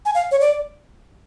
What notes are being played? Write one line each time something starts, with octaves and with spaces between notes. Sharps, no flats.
G#5
F5
C#5
D5